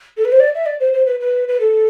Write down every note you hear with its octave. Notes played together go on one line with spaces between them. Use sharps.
A4
B4
C5
D5
E5
D5
C5
C5
B4
B4
B4
A4